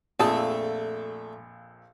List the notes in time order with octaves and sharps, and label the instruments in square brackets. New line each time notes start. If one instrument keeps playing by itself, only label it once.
[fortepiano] A#1 F2 [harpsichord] A3 A4 D5 [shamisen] G#4 A5